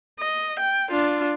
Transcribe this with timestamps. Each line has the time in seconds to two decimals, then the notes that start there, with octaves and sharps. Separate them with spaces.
0.20 D#5
0.60 G5
0.91 D4 F4